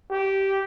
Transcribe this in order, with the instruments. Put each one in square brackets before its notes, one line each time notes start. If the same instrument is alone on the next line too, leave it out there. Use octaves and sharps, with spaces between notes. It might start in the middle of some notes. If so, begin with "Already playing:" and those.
[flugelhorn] G4